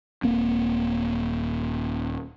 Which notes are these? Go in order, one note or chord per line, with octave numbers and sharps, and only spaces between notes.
D#1 A#3 C4